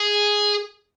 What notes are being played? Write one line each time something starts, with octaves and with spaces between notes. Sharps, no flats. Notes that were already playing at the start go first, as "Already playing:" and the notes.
Already playing: G#4